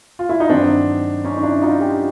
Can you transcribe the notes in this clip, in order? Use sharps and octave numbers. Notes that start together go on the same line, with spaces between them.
F4
E4
D#4
G2 D#3 F#3 C4 D4
C#4 D#4
D#4
D4 E4
D#4 F4
F4 G4